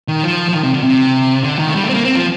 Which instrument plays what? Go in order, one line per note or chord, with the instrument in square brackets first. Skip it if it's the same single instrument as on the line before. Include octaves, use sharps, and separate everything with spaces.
[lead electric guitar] D#3
F3
F3
D#3
C3
D3
C3
D3
D#3
A3
G3
A3
C4
A#3
C4
F3